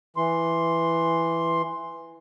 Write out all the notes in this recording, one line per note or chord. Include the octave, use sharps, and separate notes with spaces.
E3 C6